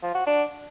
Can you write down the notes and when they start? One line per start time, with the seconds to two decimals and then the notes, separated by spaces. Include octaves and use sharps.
0.03 F3
0.15 F#4
0.27 D4